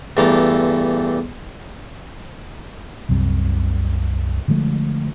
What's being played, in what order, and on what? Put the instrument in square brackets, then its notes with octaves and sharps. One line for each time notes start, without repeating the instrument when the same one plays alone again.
[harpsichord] E2 G2 A3 F5 A#5 D6
[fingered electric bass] C2 F#2 C3 G3
D3 F3 G#3 A3